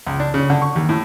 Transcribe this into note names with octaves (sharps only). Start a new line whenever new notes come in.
C#2
D4
C#3
D3
C#6
D#2
A2